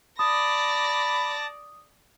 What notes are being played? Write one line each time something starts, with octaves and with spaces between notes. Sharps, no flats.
D5 A5 B5 D#6 A#6